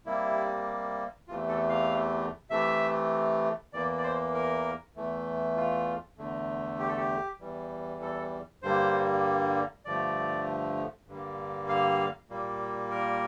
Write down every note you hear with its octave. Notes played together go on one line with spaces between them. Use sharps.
C3 G3 A#3 E4
E2 C3 E3 A3 F4
A4
F5
C3 E3 A3 E5
E2 E3 A#3 D5
D5
C5
A#4
E2 E3 A3
F4
E2 D3 A3
G4
A4
G4
E2 E3 G3
A4
G2 D3 G3 A#3 C5
G2 D3 F3 A3 D5
G2 D3 G3 A#3
F5
A#2 G3 A#3
A#4